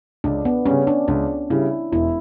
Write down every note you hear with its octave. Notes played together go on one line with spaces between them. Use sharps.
C#2 D4
B3
C#3 G3 C#4
D4
C#2 D4
C#3 G3 E4
E1 E4